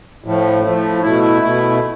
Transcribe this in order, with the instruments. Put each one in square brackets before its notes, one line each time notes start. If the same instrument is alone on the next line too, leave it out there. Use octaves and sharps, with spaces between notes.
[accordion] A2 F3 A3
A2 F3 A3
B2 A3 E4
B2 A3 E4